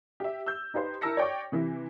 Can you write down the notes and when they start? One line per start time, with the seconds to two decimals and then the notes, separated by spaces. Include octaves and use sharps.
0.20 G4 E5
0.46 E6 G6
0.74 D#4 G4 B4 C5
1.01 E4 A#4 A5 E6 A#6 C#7
1.17 C#5 D5 G5 C#6 D6
1.52 C3 E3 E4